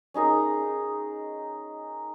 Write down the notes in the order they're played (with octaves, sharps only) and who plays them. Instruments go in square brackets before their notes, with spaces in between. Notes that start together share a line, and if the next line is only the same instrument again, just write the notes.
[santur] C#4 D#4 G#4 A#4